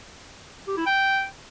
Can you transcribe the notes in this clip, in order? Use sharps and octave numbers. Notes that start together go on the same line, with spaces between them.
G4
E4
G5